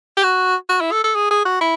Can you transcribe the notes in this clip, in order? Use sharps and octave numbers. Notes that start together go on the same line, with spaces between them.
G4
F#4
F#4
E4
A4
A4
G#4
G#4
F#4
E4